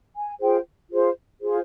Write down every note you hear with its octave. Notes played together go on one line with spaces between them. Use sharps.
G#5
F4 G#4 C5 G5
F4 G#4 C5
F4 G#4 C5